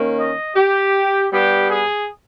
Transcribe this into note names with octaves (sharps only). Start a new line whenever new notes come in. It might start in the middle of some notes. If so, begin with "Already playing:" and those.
Already playing: D#3 A#3 C#4
D#5
G4
G2 G3 B3 G4
G#4